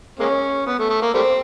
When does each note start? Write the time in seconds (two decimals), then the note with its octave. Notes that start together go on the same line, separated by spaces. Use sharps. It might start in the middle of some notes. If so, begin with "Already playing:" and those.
0.19 G#3 A#3 C#4
0.66 B3
0.79 A3
0.90 A3
1.02 A#3
1.14 G3 A3 C4